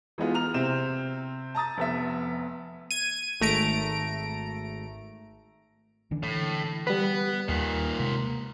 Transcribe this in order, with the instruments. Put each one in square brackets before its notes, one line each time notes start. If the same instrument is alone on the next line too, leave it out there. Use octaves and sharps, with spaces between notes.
[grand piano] E3 G#3 B3 F4
A#5 F6 F7
C3 C4 E7
A5 A#5 D#6 A6
F1 B3 E5
[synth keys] G#6 D#7
G#1 A3 A#5 D7
[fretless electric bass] D3 E3 D4
[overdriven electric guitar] A2
[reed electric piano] G3 B4 [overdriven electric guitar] B3
[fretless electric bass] D#2 [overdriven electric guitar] A#2 D#3
[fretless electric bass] C3 G#3 A#3